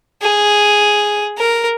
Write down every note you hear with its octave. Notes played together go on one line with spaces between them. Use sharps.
G#4
A#4